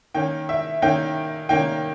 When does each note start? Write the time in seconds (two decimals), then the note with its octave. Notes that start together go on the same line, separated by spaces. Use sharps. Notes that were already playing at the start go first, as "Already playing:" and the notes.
0.14 D#3 A#3 C#4 G5
0.49 E5
0.82 D#3 A#3 C#4 G5
1.49 D#3 A#3 C#4 G5